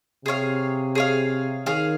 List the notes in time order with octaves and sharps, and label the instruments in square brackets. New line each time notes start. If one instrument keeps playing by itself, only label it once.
[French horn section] C3 [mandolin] G#4 C#5 F5
[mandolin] G#4 C#5 F5
[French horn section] D#3 [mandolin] G#4 C#5 F5